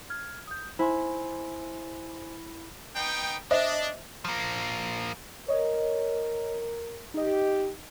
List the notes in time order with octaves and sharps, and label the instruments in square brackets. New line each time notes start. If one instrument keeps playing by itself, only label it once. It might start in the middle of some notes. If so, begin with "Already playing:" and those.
[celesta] F6 G#6
D#6 G6
[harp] E4 [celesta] C5 G#5 C6
[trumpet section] B3 D#4 G5
[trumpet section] D4 [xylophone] C5 E5 [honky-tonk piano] D#5
[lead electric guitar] F3 A#3
[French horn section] A#4 [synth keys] C#5 D#5
[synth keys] D#4 D#5 [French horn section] G4